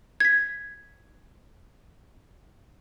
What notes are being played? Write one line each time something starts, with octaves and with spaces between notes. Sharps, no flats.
G#6 B6